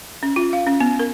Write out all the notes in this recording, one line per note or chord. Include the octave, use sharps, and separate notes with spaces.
C#4
F4
F5
C#4
B3
A#4